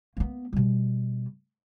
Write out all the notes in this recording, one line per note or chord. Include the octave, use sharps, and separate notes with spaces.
A#3 B3
B2 G3